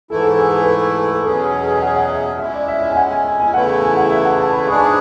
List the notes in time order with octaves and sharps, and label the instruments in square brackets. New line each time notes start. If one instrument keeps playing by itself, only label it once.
[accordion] G#2 E3 A3 E4 [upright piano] A4
[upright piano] A4
G#4
A4
B4
A4
G#4
A4
[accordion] E2 B2 F#3 C#4 G#4 [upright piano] B4
[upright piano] G#5
F#5
F#5
E5
[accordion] G#3 C#4 E4 [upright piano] E5
[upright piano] D5
E5
E5
G#5
F#5
G#5
G#5
G#5
[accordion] E2 C#3 E3 A3 E4 [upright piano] F#5
[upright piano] G#5
F#5
E5
F#5
A5
B5
[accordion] G#2 G#3 D4 G#4 [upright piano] C#6
[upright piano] B5